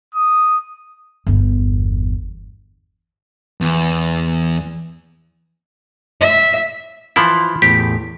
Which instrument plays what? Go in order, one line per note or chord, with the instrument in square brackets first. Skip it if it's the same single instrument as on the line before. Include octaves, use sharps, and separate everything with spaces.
[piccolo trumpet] D#6
[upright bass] G1 E2
[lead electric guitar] E2
[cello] E5
[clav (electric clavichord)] E3 F3 E4 [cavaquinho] F4 B5 C6
[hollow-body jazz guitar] E2 A2 [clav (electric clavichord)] G4 [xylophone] B6